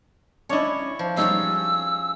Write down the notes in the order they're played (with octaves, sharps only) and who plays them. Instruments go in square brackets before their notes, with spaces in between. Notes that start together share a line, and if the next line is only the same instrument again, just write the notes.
[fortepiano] C#4 D4 D#5 [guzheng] E4 C#5
[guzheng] F3
[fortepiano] G3 D#4 [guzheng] C#4 G#4 [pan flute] E6